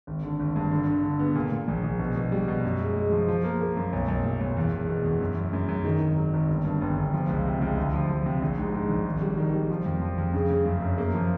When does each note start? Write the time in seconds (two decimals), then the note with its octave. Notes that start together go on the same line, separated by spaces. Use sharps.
0.07 G#1
0.23 D3
0.40 G#1
0.56 G2
0.72 D3
0.87 D3
1.04 D3
1.19 B3
1.35 A#2
1.52 A#2
1.68 A#1
1.84 A#1
1.99 B2
2.16 B2
2.32 G3
2.48 B2
2.64 F#2
2.80 G#3
2.96 G#3
3.12 F3
3.28 F3
3.44 A#3
3.61 A#3
3.77 F#2
3.93 B1
4.08 B1
4.24 A#2
4.41 B1
4.57 E2
4.72 E1
4.88 B2
5.04 E2
5.21 F#2
5.37 F#2
5.53 F#2
5.68 F#2
5.85 D#3
6.01 G#1
6.17 F#3
6.34 G#1
6.49 G1
6.65 G2
6.81 G1
6.97 G1
7.13 F3
7.29 C#2
7.45 C3
7.61 C#2
7.78 D2
7.93 F3
8.09 F3
8.26 C3
8.42 A#1
8.58 G#2
8.74 G#2
8.89 A#1
9.06 G#1
9.22 G3
9.38 D#3
9.54 G3
9.70 F3
9.86 F2
10.02 F3
10.18 F2
10.34 C#3
10.50 C#3
10.66 F#2
10.82 F#2
10.98 A#3
11.14 F3